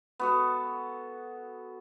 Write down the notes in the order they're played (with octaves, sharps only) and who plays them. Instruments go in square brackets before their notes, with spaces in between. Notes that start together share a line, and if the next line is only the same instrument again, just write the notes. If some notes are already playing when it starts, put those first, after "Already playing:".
[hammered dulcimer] B3 F#4 A4